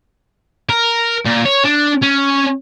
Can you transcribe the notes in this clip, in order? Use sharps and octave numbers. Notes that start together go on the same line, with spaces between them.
A#4
A#2
C#5
D4
C#4